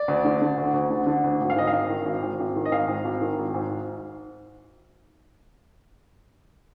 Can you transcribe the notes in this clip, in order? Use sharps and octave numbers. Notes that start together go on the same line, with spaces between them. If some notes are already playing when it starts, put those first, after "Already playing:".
Already playing: D5
D2
D3
D3
D2
D2
D3
D3
D2
G#1
F5
G#2 D#5
F5
G#1
D#3
G#1
G#2
G#1
D#3
D#5
G#1 F5
G#2
G#1
D#3
G#1
G#2